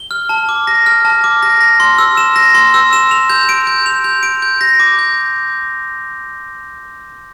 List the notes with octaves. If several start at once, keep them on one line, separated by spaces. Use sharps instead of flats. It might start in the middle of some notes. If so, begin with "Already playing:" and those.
Already playing: G7
F6
A5
D6
A#6
F6
A5
D6
A#6
A#6
C6
E6
E7
A#6
C6
E6
E7
F7
G6
D7
G6
F7
G6
D7
G6
A#6
D6
G6